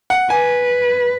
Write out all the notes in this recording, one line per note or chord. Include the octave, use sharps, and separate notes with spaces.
F#5
B4 G#5